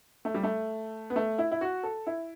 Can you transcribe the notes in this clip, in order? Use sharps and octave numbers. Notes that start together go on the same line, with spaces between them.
A3
G3
A3
B3
A3
E4
E4
F#4
A4
E4